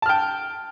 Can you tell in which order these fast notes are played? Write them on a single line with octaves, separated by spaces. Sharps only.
A5 F6 G5